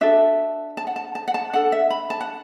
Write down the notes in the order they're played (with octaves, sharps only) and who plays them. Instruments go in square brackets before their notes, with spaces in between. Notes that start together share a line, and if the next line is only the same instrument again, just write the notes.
[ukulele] D4 F#4 A4 E5
A5
F#5
A5
A5
F#5
A5
D4 A4 F#5
E5
B5
A5
F#5